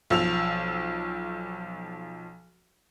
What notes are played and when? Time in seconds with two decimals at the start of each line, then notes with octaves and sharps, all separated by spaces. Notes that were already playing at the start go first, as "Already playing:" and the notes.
0.10 B1 F3 E6 F7